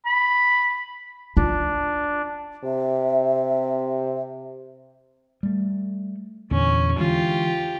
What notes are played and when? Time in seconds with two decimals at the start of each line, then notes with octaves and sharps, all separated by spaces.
0.06 B5
1.37 D4 F4
2.64 C3 E5
5.43 G3 A3
6.51 E2 A#2 D3 C#4
6.98 D3 E3 G#3 F4 G4